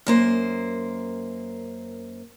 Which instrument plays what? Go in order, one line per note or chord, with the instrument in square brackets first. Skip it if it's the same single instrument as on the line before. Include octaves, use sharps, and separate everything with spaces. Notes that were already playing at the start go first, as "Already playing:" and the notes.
[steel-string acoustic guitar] F#2 A#3 C5